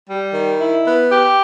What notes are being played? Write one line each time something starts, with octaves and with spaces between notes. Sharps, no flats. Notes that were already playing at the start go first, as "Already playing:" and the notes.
G3
D#3
E4
B3
G4